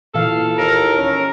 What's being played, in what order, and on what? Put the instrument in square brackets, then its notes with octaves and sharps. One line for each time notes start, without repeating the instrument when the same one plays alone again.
[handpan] A#2 E3 F5 [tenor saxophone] A4
[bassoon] D#2 [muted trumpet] A#4
[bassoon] C#4 [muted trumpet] A#4